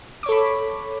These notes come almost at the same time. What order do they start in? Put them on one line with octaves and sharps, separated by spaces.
D6 C#5 A4 B5